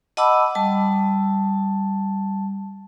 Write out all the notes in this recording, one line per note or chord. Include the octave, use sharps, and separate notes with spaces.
D#5 F#5 A5 B5 D6 E6
G3 A5